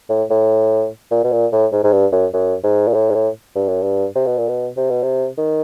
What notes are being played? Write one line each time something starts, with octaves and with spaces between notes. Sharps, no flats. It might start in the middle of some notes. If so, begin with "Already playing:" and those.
A2
A2
A#2
B2
A#2
A2
G#2
G#2
G2
F#2
F#2
G#2
A#2
A2
G#2
A2
G2
F#2
G2
C3
B2
A#2
B2
C3
B2
C3
D#3